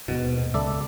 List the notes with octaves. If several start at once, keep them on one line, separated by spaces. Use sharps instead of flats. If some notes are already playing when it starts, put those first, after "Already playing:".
D#2 G#2 B2
C#2 A4 D5 E5